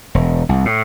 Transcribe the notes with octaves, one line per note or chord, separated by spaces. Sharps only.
E1
C2
A2